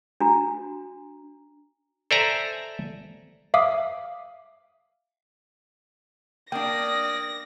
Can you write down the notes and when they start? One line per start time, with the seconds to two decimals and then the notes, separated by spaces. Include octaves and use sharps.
0.20 D4 F#4 A#5
2.11 A4 C5 D5 E5 G#5 A#5
3.54 E5 F5 D6 D#6
6.52 A#3 D4 D5 G5 D#6 A#6